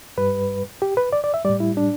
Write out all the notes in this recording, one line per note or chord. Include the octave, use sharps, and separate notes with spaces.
G2 G3 B4
G4
B4
D5
D5
E5
A2 G3 D5
E4
D4